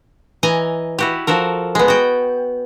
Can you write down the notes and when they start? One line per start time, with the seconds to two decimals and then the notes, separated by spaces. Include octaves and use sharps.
0.43 E3 D#5 G#5 A#5
0.99 E4 F#4 G4
1.27 F3 F#4 A4 A#4
1.75 G#3 B3
1.88 F#4 G5